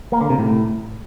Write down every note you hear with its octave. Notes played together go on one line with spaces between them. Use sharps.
A#3
D3
C3
A2